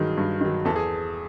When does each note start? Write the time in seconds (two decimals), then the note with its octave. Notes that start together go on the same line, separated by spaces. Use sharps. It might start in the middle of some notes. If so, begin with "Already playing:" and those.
Already playing: G2 D#3 F#3 G#4
0.17 G2
0.41 D#3 F#3
0.65 E2 A4
0.76 G#4